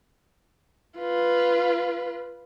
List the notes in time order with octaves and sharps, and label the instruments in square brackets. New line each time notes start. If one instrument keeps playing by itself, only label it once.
[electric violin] F4 B4